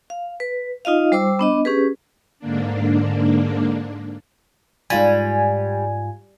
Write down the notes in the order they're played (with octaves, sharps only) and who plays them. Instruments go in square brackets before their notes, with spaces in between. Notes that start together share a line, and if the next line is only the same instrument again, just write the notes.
[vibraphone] F5
B4
D#4 F4 D#5 F5
G3 C5 D6 E6
B3 D4 D#5
C#4 G4 G#4 B4
[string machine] G#2 D3 A#3 D4
[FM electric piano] G#2 F4 G#5 [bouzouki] G3